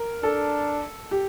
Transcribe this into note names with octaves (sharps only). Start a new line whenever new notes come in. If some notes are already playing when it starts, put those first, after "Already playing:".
Already playing: A#4
D4 A4
G4